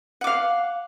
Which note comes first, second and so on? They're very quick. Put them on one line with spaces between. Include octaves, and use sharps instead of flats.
F#5 D6 F5